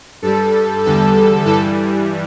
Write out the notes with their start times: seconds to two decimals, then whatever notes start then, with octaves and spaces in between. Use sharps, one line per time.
0.22 G2 G3 A4
0.84 E2 D3 G3 A4
1.45 G2 E3 G3 A4